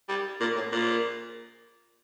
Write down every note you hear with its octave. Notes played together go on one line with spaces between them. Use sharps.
G3
A#2
A2
A#2